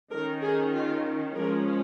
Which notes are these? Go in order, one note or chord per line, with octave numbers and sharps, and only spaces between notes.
D#3 C#4 A#4
G#4
F4
F3 G#3 C#4 A#4